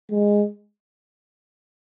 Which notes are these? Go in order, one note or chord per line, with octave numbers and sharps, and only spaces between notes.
G#3